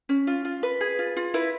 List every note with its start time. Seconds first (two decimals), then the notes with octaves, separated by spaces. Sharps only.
0.09 C#4
0.27 F4
0.45 F4
0.63 B4
0.81 G#4
0.99 F4
1.17 F4
1.34 E4 B4